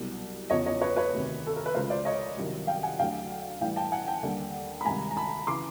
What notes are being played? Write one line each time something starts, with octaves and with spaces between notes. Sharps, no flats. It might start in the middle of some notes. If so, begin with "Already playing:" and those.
Already playing: C2 B2 F#3
E2 C#3 F3 C#5 D#5
C#5 D#5
B4 C#5
B4 C#5
D2 C3 D#3
A4
A#4
B4
C#2 C#3 F3 A#4 C5
C5 D5
C#5 D#5
C2 C3 D#3 F#3
F5 G5
F#5 G#5
D2 D3 F#3 F5 G5
A2 E3 G3 F5 G5
G5 A5
F#5 G#5
G5 A5
D#2 D3 G3
B5
C#2 C3 D#3 G3 G#5 A#5
A#5
A5 B5
C#3 E3 C6 D6